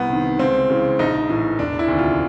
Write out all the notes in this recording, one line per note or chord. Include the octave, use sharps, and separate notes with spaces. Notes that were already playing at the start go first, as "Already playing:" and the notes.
Already playing: C2 B3
C3 D#3
C#2 C4
C#3 E3
A#1 D#4
A2 E3
E1 D4
E4
D2 C3 D#3
F4